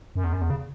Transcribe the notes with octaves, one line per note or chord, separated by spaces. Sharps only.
F#2
E2
F#2
E2
C#3